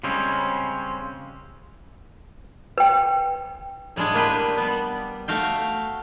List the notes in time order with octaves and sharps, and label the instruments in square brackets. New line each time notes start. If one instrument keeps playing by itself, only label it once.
[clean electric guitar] C#3 G3 G#3 C4 C#4
[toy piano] B4 G5
[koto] A2 G3 G#3 D4 G#4
A#3 D4 B4 G5
G3 B3
A3 F#4 F5 G5